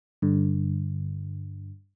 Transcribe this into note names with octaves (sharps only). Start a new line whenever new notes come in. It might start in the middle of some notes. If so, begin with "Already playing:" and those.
G2 D3